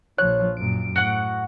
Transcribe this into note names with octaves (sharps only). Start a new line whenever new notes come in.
A#1 F3 C#5 F#6
F#2 A#2 D7
A2 F#4 F#5